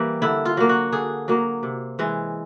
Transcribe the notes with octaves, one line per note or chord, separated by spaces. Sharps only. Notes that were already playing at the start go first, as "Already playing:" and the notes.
Already playing: E3 G3 A#3
D3 E4
F4
F#3 A#3
F#4
D3 G#4
F#3 A#3
C3
E3 G#3